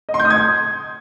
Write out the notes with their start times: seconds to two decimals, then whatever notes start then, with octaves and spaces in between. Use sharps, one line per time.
0.09 D#5
0.14 C6
0.19 G6
0.25 D#6
0.30 G#6